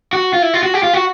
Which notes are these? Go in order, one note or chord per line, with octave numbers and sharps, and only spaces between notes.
F#4
F4
E4
F4
F#4
G4
F4
F#4